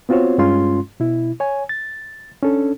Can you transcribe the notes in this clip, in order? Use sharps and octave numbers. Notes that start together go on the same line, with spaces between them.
B3 C4 F4 F#4 C5 C#5
G2 G#3 C#4 F4 C6
B2 E4
C#5 G#5
A6
C#4 D4 A4